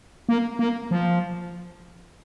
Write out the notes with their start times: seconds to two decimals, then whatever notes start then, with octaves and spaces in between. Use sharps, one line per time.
0.29 A#3
0.59 A#3
0.91 F3